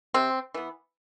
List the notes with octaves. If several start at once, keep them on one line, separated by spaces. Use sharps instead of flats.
C3 C4
E3 B3